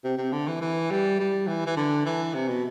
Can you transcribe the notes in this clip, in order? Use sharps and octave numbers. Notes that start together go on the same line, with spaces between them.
C3
C3
D3
E3
E3
G3
G3
E3
E3
D3
E3
C3
B2